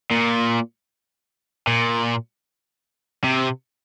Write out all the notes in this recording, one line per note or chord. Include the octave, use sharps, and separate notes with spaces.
A#2
A#2
C3